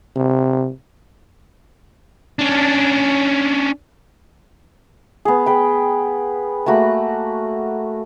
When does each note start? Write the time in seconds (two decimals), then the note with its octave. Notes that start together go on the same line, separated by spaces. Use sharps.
0.16 C3
2.39 C#4 D4
5.25 B3 G#4
5.46 G#4 B4 G5
6.66 A3 A#3 F#4 B5